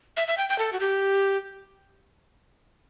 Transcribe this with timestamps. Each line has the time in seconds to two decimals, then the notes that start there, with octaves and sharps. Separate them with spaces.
0.17 E5
0.28 E5
0.38 G5
0.49 G5
0.59 A4
0.73 F#4
0.80 G4